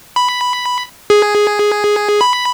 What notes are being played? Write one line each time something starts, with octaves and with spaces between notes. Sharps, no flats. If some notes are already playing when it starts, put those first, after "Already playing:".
B5
G#4
B5